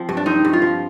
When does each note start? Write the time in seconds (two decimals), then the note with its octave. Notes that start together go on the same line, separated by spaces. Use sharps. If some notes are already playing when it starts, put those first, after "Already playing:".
Already playing: F3 C4
0.09 G2
0.17 D4
0.26 C4 D#4
0.45 G2
0.53 F4
0.62 F3